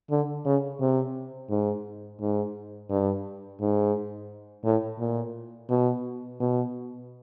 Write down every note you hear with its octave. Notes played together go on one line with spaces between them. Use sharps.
D3
C#3
C3
G#2
G#2
G2
G#2
A2
A#2
B2
B2